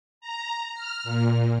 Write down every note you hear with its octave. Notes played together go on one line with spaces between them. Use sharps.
A#5
F6
A#2